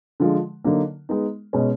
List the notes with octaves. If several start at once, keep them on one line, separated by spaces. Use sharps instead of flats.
D3 F3 G#3
D3 F#3 A#3 D#4
G#3 B3 D#4
B2 G#3 C#4